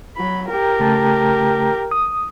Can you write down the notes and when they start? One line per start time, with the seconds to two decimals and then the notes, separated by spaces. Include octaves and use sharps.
0.16 F#3 B5
0.48 G4 A#4
0.80 C#3 A3 A5
1.91 D#6